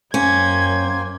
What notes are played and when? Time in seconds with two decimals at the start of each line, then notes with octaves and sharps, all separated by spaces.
0.14 F#2 A#3 C#4 C5 G5 G#6